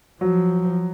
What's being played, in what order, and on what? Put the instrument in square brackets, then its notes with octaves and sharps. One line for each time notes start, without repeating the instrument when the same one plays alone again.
[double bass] F3 [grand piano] F#3